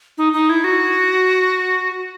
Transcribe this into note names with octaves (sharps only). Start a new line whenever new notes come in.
D#4
D#4
E4
F#4